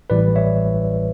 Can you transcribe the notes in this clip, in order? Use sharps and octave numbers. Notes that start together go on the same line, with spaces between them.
A1 A2 E3 G3 B4 D5
C#5 E5